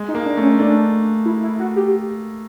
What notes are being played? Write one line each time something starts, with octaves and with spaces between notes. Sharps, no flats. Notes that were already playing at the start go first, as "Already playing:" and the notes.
Already playing: G#3
D#4
A#3
D4
A3 C#4
A3 D4
E4
E4
F#4
G4